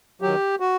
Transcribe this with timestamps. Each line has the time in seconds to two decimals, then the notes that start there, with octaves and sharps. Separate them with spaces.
0.22 D#3 F#3 G4
0.60 F#4